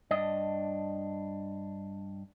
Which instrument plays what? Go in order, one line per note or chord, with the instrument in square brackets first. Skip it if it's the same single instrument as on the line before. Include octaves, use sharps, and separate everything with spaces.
[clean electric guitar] G2 D4 D#5